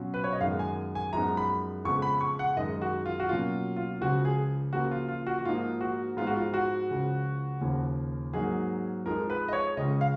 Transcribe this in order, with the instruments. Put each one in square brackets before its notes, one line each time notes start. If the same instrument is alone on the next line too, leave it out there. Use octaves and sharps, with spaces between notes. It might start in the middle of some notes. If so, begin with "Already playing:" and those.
Already playing: [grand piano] B2 F#3 C#4 F4
B4
C#5
D#5
F#2 D#3 G#3 B3 F5
G#5
G#5
F#2 F3 G#3 B3 D#4 A#5
B5
F2 C#3 G#3 B3 C#6
B5
C#6
F#5
F#2 D#3 G#3 D#5
F#4
F4
F#4
B2 F#3 A#3 C#4 F4
F4
C#2 C#3 F3 F#4
G#4
C#3 F3 A#3 F#4
F4
F4
F#4
F#4
G#2 F3 A#3 D#4 F4
F#4
G#2 F3 G#3 B3 F4
F#4
F4
F#4
C#2 C#3 F3
D#2 C#3 F3
G#2 F#3 A#3 D#4 G#4
F2 F3 G#3 D#4 A#4
B4
D#5
C#5
C#2 C#3 G#3 C#4 D#5
F5